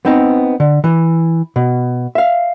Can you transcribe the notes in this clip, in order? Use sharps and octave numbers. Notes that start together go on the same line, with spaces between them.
B3 C4 D#4
D3
E3
B2
E5 F5